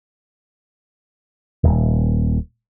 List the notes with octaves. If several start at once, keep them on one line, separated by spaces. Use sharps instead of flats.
D#1